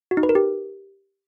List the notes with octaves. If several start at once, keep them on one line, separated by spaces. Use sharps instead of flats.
F#4
D#4
B4
A#4
G4